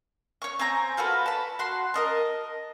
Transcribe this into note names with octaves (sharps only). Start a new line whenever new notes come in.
C#5 C#6
C4 G#5 A#5 G6
F4 F#4 A4 B4
A5 B5
F#4 F#5 C6
A#4 D#5 A5